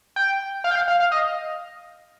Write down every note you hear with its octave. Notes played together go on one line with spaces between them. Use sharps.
G5
F5
G5
F5
F5
F5
D#5